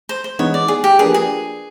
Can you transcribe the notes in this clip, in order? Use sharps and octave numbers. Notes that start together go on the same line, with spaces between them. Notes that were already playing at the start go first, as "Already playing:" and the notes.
C5
C5
E3 G#3 B3 D#4 C#5
D5
G#4
G4
F3 A#3 D4 G4 G#4 B4
G#4